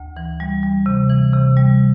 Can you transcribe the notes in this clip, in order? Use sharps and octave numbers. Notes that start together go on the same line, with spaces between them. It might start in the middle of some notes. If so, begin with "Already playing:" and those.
Already playing: D2
E3
G3
G3
C3
E3
C3
G3